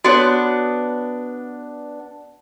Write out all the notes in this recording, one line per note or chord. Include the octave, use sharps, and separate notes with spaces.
B3 D4 F#4 C#5